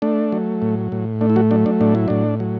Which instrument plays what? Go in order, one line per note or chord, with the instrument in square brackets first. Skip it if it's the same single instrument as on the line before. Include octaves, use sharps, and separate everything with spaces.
[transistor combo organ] A3 D4
F#3
A2
A2
A3 D4
E4
F#3 F#4
F#3 D4
D4
A2 D4
E4
A2 D4
F#3